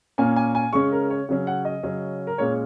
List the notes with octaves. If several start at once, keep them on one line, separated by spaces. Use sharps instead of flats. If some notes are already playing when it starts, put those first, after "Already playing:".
A#2 A#3 C#4 G#5
G#5
G#5
C#3 G#3 C#4 C#6
A#4
C#5
C#3 F#3 C#4
F#5
D#5
C#3 F#3 C#4
A#4
A#2 G#3 C#4 C#5